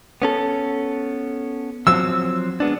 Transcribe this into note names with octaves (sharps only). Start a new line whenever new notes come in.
B3 C#4 A4
F3 F#3 C4 E6
G#3 B3 D4